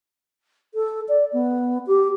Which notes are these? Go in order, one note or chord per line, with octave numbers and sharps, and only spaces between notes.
A4
D5
B3
G4